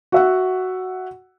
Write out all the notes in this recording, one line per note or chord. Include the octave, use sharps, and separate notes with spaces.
F#4 E5 F#5